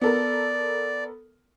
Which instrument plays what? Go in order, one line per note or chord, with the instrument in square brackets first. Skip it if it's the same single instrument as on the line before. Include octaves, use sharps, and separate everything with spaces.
[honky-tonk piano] B3 A4 A#4 [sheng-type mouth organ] D5